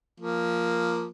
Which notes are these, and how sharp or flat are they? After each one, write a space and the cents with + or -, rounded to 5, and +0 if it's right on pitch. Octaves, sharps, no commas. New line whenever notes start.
F3 +0 A#3 +0